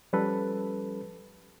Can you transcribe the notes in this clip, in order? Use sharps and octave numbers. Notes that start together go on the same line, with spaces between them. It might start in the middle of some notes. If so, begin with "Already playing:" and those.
F3 G3 C#4 A4 B4